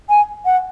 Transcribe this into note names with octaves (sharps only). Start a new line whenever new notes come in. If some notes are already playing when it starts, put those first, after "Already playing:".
G#5
F#5